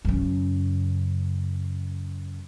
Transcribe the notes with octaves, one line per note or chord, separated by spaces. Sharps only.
F#2 C#3